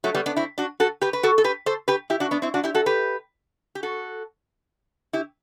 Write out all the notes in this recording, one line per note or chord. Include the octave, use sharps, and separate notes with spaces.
F#3 A3
G3 B3
B3 D4
C4 E4
D4 F#4
F#4 A4
G4 B4
B4
F#4 A4
A4
G4 B4
A4 C5
G4 B4
E4 G4
D4 F#4
B3 D4
C4 E4
D4 F#4
E4 G4
F#4 A4
G4 B4
G4
F#4 A4
E4 G4